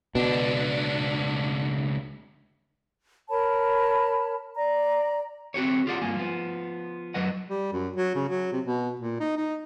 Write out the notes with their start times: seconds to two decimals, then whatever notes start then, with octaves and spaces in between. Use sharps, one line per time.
0.15 C#2 B2 D4
3.29 A#4 C#5 A5 B5
4.54 D5 A#5
5.54 C4 F#4 G4 C#5
5.87 F4 G4 G#4 D5 D#5 F#5
6.02 G2 A#3 F4 G#5
6.16 F3 B3
7.14 F#2 F#3 B4 D#5 F#5
7.49 G3
7.73 F#2
7.96 F#3
8.15 C#3
8.29 F#3
8.52 C3
8.65 B2
9.00 A#2
9.20 D#4
9.37 D#4